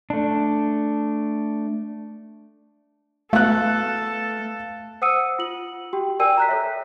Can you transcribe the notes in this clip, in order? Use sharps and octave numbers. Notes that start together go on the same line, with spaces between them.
A3 D4
A3 B3 E4 F#4 A4 F5 F#6
C5 F#5 D#6 E6 C#7 D#7
F4 F#7
F#4 G4 G5
A#4 D5 G5 G#5 E6 D#7
A#5 F#6 B6
A4 C#5 E5